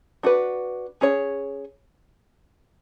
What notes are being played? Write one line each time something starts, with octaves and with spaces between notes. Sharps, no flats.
D4 F#4 B4
C#4 G#4 C#5